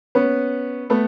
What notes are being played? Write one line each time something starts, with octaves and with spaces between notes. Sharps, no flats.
B3 C#4
A3 B3